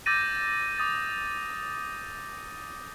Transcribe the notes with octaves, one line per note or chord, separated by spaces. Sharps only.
D6 E6 G6 A6 A#6 D#7
D6 D#6 A6